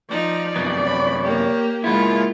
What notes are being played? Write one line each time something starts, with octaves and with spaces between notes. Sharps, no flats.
F3 D#4 D5
F#2 C3 B3
C#5 B5
A#3 G4
G#3 A#3 B3 E4 F4